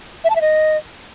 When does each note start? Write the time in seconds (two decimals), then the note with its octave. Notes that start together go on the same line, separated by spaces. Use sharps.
0.24 E5
0.30 A5
0.36 E5
0.41 D#5